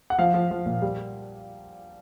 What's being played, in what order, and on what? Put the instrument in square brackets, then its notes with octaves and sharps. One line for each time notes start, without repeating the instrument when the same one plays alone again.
[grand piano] F#5
F3 F5
F3
F3
A#2
G3